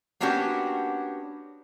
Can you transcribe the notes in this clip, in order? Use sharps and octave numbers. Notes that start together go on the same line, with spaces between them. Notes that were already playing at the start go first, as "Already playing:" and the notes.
A#3 B3 C#4 D4 F#4 G4